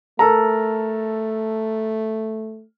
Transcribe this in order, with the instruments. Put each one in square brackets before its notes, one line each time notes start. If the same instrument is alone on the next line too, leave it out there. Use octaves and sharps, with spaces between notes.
[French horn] A3 [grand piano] A4 A#4 A#5